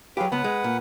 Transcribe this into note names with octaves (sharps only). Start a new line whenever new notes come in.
F#3 F4 G4 G#4 B4
C#2 B3 B4 F#5
G#3
A#2